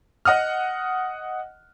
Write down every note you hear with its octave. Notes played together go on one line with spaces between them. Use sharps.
D#5 F#5 D#6 F6